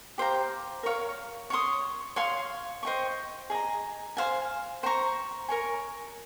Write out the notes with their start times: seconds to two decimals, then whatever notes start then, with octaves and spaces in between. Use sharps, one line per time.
0.18 G4 C5 F5 A#5
0.83 A#4 C#5 F5
1.50 C#5 F5 C6 D#6
2.16 C#5 F5 C6
2.83 C5 D#5 G5 C#6
3.50 G#4 D#5 A#5
4.17 C5 F5 G#5
4.83 C5 G5
4.86 A#5 C#6
5.48 A#4 C#5 G#5